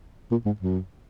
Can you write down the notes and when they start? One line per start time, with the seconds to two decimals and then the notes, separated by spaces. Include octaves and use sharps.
0.31 A#2
0.46 G#2
0.60 F#2